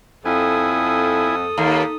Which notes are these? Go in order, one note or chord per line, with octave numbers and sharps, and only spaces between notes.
F2 E4 A4 G#5 D#6
D#2 A#3